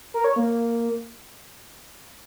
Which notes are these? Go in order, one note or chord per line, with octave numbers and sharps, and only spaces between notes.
A#4
C#5
A#3